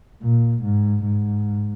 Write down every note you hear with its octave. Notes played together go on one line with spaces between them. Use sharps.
A#2
G#2
G#2